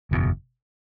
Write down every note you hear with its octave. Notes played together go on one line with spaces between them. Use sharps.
F#1 E2 B2